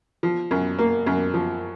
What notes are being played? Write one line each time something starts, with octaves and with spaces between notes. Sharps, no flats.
F3
F#2
A#3
F#2
F3